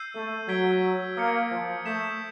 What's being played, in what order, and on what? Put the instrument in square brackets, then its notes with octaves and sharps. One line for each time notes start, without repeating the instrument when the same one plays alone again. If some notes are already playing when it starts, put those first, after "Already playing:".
Already playing: [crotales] E6 G6 C7 D#7
[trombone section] A3
[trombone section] F#3 [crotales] G#6 B6 D7 G7
[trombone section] A#3 [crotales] D#6 G#6 C#7
[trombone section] F3
[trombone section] A3 [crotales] D#6 G6 B6 E7